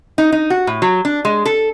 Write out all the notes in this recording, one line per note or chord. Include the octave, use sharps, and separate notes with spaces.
D#4
D#4
F#4
A2
F#3
D4
G#3
A4